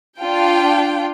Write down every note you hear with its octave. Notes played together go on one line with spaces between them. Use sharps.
D4 F4 G5